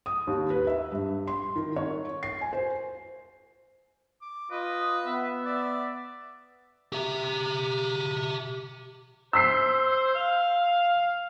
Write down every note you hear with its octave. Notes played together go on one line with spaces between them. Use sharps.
D#6
D#2
B4
E5
G2
C6
D#3
C#5
C7
G#5
C5
D6
F4 B4 D#5
B3 E5
D5
G4 E5
C5 E6 B6 C7
F5